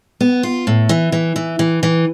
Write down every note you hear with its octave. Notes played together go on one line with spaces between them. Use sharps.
B3
F4
A2
E3
E3
E3
E3
E3